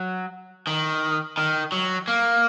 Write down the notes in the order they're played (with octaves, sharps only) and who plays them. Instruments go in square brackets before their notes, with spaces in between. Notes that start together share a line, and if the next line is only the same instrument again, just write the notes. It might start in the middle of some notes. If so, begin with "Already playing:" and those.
Already playing: [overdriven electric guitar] F#3
D#3
D#3
F#3
A#3